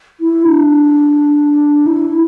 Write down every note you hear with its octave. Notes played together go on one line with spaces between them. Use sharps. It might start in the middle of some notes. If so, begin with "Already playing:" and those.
E4
D4
E4